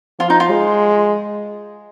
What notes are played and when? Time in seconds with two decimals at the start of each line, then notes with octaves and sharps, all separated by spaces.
0.19 F3 F4
0.30 D#4
0.40 F4
0.50 G#3